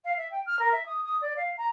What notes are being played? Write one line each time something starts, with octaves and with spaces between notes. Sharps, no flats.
F5
E5
G5
F6
A#4
E5
D#6
D#6
D5
F5
A#5